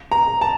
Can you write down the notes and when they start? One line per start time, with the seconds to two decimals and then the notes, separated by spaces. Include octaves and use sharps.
0.12 A#5
0.41 A5